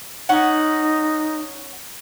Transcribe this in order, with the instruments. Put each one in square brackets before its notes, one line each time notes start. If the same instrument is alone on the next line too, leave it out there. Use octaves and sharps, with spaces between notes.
[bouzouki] C#4 F#5 [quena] D#4